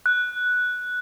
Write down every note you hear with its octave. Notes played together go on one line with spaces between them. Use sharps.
F#6